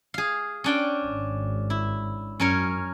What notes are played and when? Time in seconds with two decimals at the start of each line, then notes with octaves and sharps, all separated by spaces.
0.14 G#4 F5
0.64 C#4 D4 G5
1.04 G#1
1.70 E4
2.40 F#2 C#4 A#4 C#5